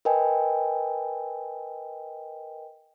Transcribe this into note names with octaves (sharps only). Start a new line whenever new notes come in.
A#4 B4 D#5 G5 G#5